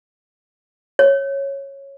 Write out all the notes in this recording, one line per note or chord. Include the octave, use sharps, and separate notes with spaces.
C#5